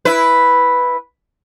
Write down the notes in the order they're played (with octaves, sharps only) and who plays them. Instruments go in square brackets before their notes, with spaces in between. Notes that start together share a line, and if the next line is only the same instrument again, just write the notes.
[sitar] E4 B4